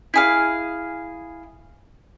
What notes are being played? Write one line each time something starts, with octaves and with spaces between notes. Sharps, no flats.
E4 G#4 F5